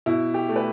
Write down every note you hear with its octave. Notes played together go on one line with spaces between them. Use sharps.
B2 E4
G4
A3
B4